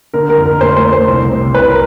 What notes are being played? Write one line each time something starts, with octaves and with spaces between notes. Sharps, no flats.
D3 A#4
A#4
F2
A#4
A3 C5
C5
A3
C5
C2
C3
C2 B4
A#4